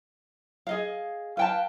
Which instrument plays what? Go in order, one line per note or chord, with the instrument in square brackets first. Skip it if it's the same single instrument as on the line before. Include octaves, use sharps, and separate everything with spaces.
[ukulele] G#4 D#5 F5
[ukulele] B4 G5 A5 [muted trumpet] F5